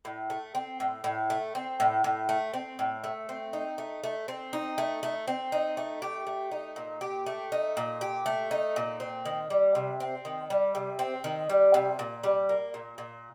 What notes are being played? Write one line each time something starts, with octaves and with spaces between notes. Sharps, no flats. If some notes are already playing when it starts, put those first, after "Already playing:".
A2
A3
C4
A2
A2
A3
C4
A2
A2
A3
C4
A2
A3
C4
D#4
A3
A3
C4
D#4
A3
A3
C4
D#4
A3
G4
A3
D#4
A#2
G4
A3
D#4
A#2
G4
A3
D#4
A#2
C4
D#3
G3
C3
C4
D#3
G3
C3
C4
D#3
G3
C3
A#2
G3
A#3
A#2
A#2